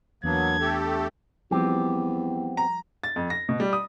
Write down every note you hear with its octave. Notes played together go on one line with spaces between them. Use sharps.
E2 F#3 A#3 B3 D4 A5 G#6
A3 G4 A4
E2 F3 G3 B3 C4 G4
A#5
A6
F2
A#6
B2
G3
D#6